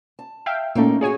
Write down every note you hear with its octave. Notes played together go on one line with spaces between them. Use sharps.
A5
E5 F5 G5
A#2 A3 A#3 C#4 D#4
F4 F#4 G#4 C#5 G#5